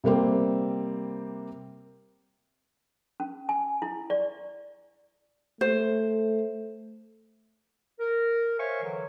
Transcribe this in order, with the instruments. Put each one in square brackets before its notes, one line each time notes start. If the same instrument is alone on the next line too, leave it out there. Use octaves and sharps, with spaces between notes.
[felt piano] C3 G3 A#3 C4
[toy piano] C#4
G#5
E4
D5
[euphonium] A3 [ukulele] C5
[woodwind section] A#4
C5 C#5 E5 F5 G#5 C#6
D3 E3 F#3